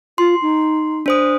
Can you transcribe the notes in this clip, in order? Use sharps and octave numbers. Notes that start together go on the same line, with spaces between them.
F4 C6
D#4
D4 C5 D#6